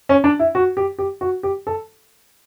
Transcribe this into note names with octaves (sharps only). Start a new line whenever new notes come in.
C#4
D4
E4
F#4
G4
G4
F#4
G4
A4